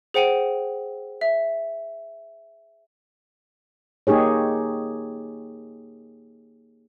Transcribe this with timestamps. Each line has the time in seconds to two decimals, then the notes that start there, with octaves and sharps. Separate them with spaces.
0.14 G#4 C5 F#5 G5 C#7 D#7
1.21 E5
4.07 A#3 D#4 G4 G#4 C#5